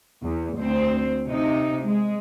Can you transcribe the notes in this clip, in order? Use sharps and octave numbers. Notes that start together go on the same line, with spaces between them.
E2
D2 C4 C5
C3 D#4
G#3